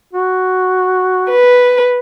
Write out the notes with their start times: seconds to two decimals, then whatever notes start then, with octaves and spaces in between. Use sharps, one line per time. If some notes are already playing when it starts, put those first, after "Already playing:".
0.13 F#4
1.30 B4